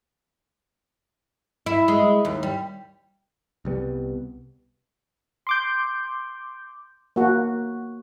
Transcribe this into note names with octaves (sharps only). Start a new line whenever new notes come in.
E4
G#3
D#2
G3
C2 G3 B3
C6 D6 G6
A#3 F#4